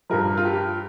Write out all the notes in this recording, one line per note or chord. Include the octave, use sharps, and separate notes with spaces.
G2 F3 A#4
F4
G4